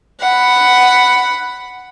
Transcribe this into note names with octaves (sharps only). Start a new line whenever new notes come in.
F#5 B5